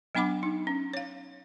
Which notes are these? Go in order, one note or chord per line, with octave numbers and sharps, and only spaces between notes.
F#3 B3 D4 F#5 B5 D6
D#4
C#4
C#5 F5